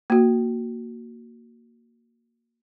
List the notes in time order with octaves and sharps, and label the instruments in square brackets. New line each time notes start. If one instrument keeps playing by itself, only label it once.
[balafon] A#3 F#4